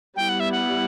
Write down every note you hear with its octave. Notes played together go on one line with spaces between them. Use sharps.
G3 B3 E4 G5
F#5
E5
F#5